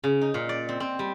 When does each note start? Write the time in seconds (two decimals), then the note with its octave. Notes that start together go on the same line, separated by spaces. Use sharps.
0.04 C#3
0.21 D#4
0.34 A#2
0.49 D5
0.69 C4
0.80 C4
0.99 G3